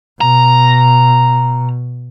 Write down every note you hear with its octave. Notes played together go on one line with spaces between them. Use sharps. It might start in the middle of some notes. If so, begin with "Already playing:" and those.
B2 A#5